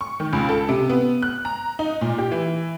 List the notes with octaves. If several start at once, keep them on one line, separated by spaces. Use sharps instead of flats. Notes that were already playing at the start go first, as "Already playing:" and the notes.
C#6
D#3
C#2
A4
C3
B3
F#6
A#5
D#4
A#2
G4
E3